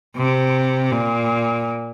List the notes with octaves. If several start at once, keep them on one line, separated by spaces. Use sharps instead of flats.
C3
A#2